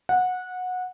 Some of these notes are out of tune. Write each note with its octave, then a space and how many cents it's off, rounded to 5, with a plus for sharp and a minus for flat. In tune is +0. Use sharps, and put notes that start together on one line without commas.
F#5 -20